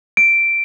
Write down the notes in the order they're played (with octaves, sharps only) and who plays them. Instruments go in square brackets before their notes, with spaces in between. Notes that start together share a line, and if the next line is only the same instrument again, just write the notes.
[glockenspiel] D7